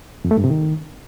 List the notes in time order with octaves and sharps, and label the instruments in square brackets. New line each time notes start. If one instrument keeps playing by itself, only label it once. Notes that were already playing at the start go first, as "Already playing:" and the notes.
[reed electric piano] F2
A3
G2
C3
D#3